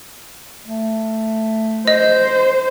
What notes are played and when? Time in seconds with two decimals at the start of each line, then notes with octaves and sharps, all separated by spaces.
0.67 A3
1.88 C5 D#5